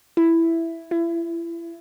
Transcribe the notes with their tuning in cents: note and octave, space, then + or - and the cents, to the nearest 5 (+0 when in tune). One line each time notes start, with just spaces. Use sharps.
E4 +5
E4 +30